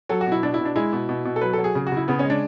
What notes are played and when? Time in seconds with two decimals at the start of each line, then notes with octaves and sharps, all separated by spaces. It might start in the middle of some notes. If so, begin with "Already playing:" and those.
0.09 F#3 A4
0.21 F#4
0.26 B2
0.32 E4
0.43 B2 D4
0.54 E4
0.59 B2
0.65 D4
0.76 G#3 E4
0.93 B2
1.09 B2
1.25 B2
1.36 A4
1.41 F#3 B4
1.53 F#3 A4
1.64 G#4
1.75 C#3
1.87 F#4
1.92 C#3 E4
2.08 C#3 B3
2.19 G#3 C#4
2.30 D4